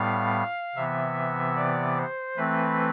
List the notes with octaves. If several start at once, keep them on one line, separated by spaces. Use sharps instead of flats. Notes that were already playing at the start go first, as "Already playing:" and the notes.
Already playing: A2 G3 B3 F5
C3 E3 B3 E5
D5
C5
E3 A3 C4 B4